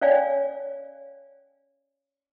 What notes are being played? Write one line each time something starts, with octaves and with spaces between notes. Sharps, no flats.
C#4 C#5 D5 F5 G#5